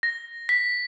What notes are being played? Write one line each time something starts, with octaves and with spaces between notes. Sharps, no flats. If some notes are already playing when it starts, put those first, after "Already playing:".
A#6
B6